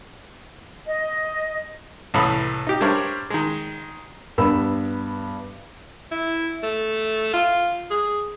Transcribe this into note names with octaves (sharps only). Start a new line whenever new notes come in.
D#5
C2 A2 E3 A4 B5 D#6
D#4 G4
G3 D4 A#4 C5 C#5
D#3 G#3
G2 B3 B5 E6
E4
A3
F4
G#4